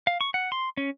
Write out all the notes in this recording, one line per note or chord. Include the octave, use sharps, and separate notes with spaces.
F5
C#6
F#5
C6
C#4